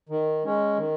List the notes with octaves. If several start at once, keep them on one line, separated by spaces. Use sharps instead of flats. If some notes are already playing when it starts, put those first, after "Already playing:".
D#3
G#3 C#4
D#3